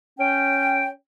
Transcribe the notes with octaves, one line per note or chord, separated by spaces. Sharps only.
C#4 G5